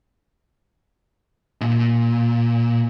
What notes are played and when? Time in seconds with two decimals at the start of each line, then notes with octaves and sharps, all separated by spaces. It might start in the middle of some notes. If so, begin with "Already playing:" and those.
1.61 A#2